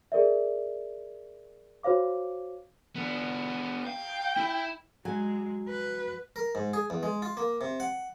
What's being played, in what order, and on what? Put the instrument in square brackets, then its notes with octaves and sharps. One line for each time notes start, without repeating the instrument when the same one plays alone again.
[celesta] G#4 A#4 D5 E5
F#4 C5 C#5 F5 D6
[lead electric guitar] B3 D4
[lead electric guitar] F5 [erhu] G5
[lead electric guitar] E4 E5
[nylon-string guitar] F#3 G#5 [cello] G#3
[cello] B4
[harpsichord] A#4
G#2
G#4
E2
G#3
F4
A#3
C3
F#5